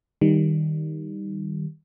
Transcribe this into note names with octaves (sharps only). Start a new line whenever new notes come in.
D#3 G3